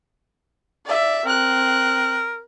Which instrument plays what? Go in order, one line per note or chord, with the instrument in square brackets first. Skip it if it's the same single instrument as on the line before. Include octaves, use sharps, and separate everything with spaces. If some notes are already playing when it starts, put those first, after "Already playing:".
[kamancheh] D5 E5
[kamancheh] C4 F#6 [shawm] A#4